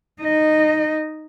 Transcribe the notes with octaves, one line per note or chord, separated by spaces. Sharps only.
D#4 D#5